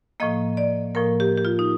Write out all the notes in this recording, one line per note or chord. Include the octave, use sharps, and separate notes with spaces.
A2 F3 A#3 D#5
D5
A2 F3 A#3 A#4
G4
G4
F4
D#4